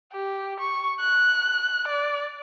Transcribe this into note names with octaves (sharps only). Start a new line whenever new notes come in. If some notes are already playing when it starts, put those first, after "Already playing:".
G4
C#6
F#6
D5